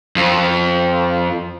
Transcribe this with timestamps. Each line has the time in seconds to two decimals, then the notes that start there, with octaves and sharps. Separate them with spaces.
0.16 F2